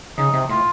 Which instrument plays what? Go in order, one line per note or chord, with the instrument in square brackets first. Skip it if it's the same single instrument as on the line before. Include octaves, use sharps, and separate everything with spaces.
[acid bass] C#3 [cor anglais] D#4
[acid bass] C3
[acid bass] A2 [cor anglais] F4